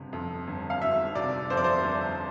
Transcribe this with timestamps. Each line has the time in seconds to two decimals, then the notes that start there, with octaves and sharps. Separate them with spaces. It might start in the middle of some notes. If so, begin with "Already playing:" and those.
Already playing: G1 C3
0.13 F2
0.47 G1
0.70 F5
0.82 G1 E5
1.15 C3 D5
1.50 F2 C5
1.57 D5
1.64 C5
1.84 G1